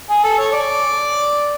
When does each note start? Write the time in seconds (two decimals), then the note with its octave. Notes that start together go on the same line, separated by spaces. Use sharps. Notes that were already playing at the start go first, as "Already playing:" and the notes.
0.09 G#4
0.24 A4
0.38 C#5
0.53 D5